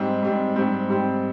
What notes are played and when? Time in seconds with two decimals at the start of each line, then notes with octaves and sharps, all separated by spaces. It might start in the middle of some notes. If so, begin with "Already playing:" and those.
Already playing: G#2 G3 C4
0.23 G#2 G3 C4
0.56 G#2 G3 C4
0.88 G#2 G3 C4